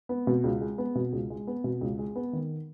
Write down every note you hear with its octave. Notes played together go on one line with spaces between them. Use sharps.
B3
B2
C#2
G#3
B3
B2
C#2
G#3
B3
B2
C#2
G#3
B3
D#3